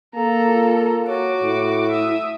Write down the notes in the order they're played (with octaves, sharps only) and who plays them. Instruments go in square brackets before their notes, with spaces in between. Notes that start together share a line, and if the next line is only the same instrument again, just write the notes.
[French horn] A#3 [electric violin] A4 A#5
[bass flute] F4
[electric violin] F#4 D6 [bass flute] C#5
[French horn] A2 [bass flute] E4
[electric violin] E5 D#6